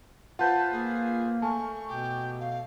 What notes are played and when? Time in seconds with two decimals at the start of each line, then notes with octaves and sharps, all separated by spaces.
0.39 F4 B4 C5 F#5 A5 G6
0.72 A#3 G#4
1.42 A3 G#5 A5 C#6
1.88 B2 G4
2.40 F5